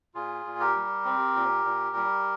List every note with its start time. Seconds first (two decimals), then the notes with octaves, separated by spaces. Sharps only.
0.14 A#2 F4 G#4
0.45 A#2
0.60 G4 A#4
0.75 G3
1.05 C4
1.36 A#2
1.65 A#2
1.95 G3